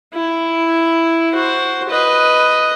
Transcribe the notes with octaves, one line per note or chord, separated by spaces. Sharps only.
E4
F#4 C5
B4 D#5